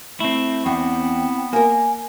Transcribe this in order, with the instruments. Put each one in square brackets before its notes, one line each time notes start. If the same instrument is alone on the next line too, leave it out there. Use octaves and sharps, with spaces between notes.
[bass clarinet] A3 [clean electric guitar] C4 E4
[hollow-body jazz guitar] E2 [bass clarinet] B3 [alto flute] G5
[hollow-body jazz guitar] A#3 A#4 [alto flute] G#5